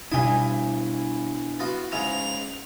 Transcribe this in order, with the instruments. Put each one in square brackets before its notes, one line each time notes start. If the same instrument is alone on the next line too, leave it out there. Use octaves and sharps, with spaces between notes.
[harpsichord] G2 G5 D#6 [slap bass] B2 D4 [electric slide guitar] E4 E5 G#5
[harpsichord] B3 F4 F#4
[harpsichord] G#2 C#3 G#3 [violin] F7